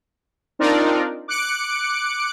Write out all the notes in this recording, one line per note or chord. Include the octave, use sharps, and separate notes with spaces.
C4 D4 D#4 F4 A#4 D5
D6 F#6 C#7 D7